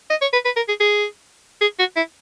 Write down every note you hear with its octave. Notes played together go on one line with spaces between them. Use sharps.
D#5
C#5
B4
B4
A#4
G#4
G#4
G#4
F#4
E4